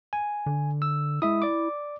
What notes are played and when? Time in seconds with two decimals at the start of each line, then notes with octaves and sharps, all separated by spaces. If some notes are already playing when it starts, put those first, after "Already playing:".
0.13 G#5
0.46 D3
0.82 E6
1.22 G#3 E4 E5 D#6
1.42 D5 D6